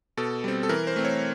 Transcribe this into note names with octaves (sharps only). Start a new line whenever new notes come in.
B2 A4
G3 C4
A4
E3 A#4
C5
A3 C4
C#5